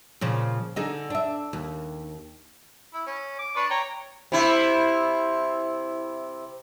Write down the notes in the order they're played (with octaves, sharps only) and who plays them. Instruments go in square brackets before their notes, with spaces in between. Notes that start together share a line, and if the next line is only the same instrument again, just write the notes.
[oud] A#2 C#3 F3
D3 D#4 G#4
D4 E5
D#2
[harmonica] E4
C#4
D6
D4 B4 C#6
C#5 G5 A#5
[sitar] C3 E4